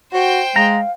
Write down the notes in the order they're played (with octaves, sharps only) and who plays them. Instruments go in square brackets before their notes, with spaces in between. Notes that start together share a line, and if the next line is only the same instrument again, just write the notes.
[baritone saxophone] F#4 [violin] C5 G5
[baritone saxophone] G#3 [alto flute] F5 [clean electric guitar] A#5